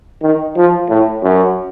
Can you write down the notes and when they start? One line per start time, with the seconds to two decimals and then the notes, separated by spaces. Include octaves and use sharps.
0.23 D#3
0.57 F3
0.90 A2
1.23 F#2